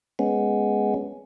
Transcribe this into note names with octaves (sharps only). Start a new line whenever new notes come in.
G#3 B3 C#4